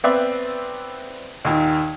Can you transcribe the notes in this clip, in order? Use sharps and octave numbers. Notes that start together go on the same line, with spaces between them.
B3 C4 B4 D5 E5
D#2 A#2 D#3